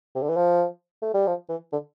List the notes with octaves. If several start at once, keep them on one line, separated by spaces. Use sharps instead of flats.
C3
D3
E3
F3
A3
G3
F3
E3
D3